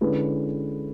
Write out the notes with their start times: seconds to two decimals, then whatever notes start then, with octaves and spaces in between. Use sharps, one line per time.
0.01 D3 G#3 C#4 E4 B4